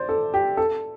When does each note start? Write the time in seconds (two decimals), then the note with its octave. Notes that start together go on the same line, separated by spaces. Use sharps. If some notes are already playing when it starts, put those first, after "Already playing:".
Already playing: C5 D5
0.09 A4
0.34 G4
0.57 A4